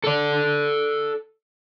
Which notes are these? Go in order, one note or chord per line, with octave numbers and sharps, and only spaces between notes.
A4 D5